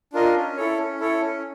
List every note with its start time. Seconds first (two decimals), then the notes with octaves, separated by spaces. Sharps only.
0.13 D4 F4 A#4 D#5
0.35 C#4
0.56 E4 A4 C#5
0.78 C#4
1.00 E4 A4 C#5
1.21 C#4